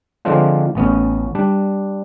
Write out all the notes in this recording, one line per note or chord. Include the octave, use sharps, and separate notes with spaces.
D3 F3 G#3 C4 D4 F4
A1 B3 C#4
G3 D4